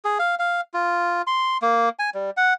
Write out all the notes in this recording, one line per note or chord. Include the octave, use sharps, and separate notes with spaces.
G#4
F5
F5
F4
C6
A#3
G#5
G3
F#5